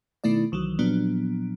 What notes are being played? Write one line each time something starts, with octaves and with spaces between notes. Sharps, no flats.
B2 D#3 A3 E4 D5
C2 D#3 E3 F#3
A#2 F3 F#3 B3 D4